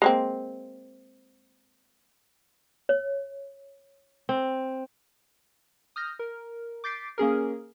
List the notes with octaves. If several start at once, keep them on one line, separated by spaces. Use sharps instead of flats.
G#3 A#3 C4
C#5
C4
D#6 F6 G6 A#6
A#4
D6 G6 A6 B6 C7 D7
A#3 C#4 G#4 A#4